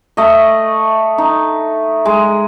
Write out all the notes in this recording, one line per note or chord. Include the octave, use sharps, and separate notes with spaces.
A3 D#5
D#4
G#3